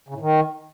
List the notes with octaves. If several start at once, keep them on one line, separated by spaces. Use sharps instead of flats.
C#3
A2
D#3